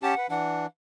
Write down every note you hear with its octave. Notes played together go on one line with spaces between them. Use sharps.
C#4 G4 F#5 A5
B4
E3 D4 F#5